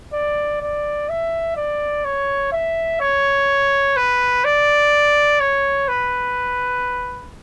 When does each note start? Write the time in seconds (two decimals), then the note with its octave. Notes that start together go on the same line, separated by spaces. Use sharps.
0.13 D5
0.61 D5
1.09 E5
1.57 D5
2.05 C#5
2.52 E5
3.00 C#5
3.97 B4
4.44 D5
5.40 C#5
5.88 B4